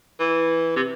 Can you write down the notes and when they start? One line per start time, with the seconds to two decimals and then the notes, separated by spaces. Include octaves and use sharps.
0.19 E3
0.76 C3